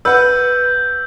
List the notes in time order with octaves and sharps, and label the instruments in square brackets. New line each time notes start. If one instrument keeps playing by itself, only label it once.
[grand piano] B4 F#5 [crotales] E6 G6